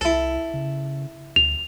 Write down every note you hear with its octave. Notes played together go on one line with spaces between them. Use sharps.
C2 E4 A4
C#3
D2 F7